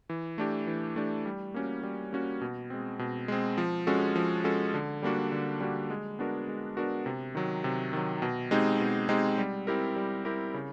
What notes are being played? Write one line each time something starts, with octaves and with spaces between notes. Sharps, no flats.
E3
A3 D4 G4
E3
A3 D4 G4
G3
A#3 C#4 F#4
G3
A#3 C#4 F#4
B2
G#3 C4
B2
G#3 C4
F3
G#3 C#4 F#4 A4
F3
G#3 C#4 F#4 A4
D3
G3 A#3 D4 F#4
D3
G3 A#3 D4 F#4
G#3
B3 D4 F#4 A#4
G#3
B3 D4 F#4 A#4
C3
D#3 F#3
C3
D#3 F#3
B2
G#3 C4 D#4 G4
B2
G#3 C4 D#4 G4
G3
C4 E4 G4 A#4
G3
C4 E4 G4 A#4
C#3